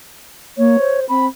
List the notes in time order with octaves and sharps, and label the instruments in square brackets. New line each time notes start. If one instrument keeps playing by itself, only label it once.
[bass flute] A#3 [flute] C#5
[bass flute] C5
[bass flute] C4 [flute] B5